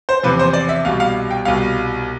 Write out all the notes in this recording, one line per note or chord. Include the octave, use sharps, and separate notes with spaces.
C5
E2 C3 F3 B4
C5
D5
E5
C2 B2 G3 F5
F5
G5
C2 B2 G3 F5